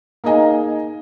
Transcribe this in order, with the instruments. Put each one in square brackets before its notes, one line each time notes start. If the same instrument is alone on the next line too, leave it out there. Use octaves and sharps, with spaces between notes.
[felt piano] A#3 D#4 G#4 D#5 G#5 A#5